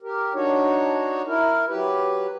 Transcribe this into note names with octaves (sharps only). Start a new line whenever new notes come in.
G4 A#4
D4 D#4 F#4 C#5
E4 A#4
F#3 G4 B4